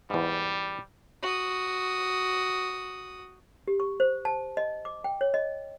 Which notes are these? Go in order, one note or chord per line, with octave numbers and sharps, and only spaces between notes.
E2 G#2 G3
F#4 D#6
G4
C#6
C5
A5
D#5
D6
G5
C#5
D#5